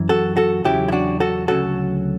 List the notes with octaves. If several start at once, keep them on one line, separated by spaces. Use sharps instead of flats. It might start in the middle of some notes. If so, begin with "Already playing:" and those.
Already playing: F#2 E3
F#4 A4
F#4 A4
E2 C#3 F#3 E4 G4
E4
D4 F#4
F#4 A4
D2 C#3 F#3 F#4 A4